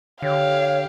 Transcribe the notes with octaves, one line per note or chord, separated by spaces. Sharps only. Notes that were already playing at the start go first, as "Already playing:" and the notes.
D3 G4 C#5 F5